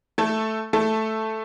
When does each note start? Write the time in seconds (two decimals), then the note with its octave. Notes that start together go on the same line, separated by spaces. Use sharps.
0.18 A3 A4
0.73 A3 A4